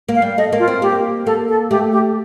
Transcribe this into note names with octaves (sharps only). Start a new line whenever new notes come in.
A#3
F5
G3
A3 D#5
A#3
F4
C4
A#3 G4
A#3 A4
A4
A3 G4
G4